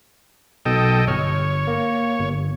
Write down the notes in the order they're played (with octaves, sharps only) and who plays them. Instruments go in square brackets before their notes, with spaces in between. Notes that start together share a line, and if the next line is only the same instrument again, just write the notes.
[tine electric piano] B1 B2 [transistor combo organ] A4 D#5 G5
[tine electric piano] G1 F6 [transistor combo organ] C#5
[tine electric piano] A#3
G1